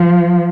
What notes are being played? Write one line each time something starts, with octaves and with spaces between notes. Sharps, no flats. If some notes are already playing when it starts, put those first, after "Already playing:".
Already playing: F3